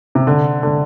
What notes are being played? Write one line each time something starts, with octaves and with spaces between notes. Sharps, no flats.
C3
D3
D3